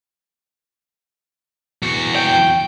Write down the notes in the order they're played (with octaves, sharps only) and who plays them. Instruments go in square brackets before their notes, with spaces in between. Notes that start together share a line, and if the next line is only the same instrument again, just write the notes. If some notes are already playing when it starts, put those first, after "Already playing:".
[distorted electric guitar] E2 F#4
[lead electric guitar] G5